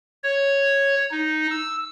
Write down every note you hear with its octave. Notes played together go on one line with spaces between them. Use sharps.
C#5
D#4
E6